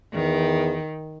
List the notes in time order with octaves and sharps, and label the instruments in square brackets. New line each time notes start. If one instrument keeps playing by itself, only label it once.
[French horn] E2 [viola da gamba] D#3